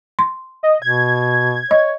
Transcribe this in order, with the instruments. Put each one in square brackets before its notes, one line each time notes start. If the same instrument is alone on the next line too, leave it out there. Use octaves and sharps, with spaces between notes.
[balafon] C6
[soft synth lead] D#5
[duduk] B2 [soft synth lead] G#6
[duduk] C#5 [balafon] D#5